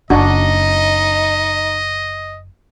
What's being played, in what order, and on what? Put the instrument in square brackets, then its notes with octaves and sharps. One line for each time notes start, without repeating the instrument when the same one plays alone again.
[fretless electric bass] F#1 [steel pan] D4 F#4 [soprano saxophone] D#4 [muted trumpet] D#5